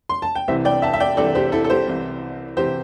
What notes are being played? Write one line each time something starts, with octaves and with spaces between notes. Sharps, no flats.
C6
A5
G5
C2 C3 E3 C5 E5
D5 G5
E5 A5
E5
D5 G5
C2 C3 E3 A4 D5
G4 C5
E4 A4
A4
G4 C5
C2 C3 E3
C3 E3 G4 C5